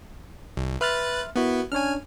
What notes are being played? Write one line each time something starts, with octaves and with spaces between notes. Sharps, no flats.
C2
B4 E5 C6 F6 F#6 A6
B3 E4 F#4 A#4
C#4 D4 C#5 G#5 F6